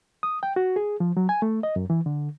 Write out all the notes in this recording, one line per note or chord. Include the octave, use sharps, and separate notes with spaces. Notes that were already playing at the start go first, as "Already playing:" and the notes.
D#6
G5
F#4
G#4
F3
F#3
G#5
A3
D#5
F#2
E3
D3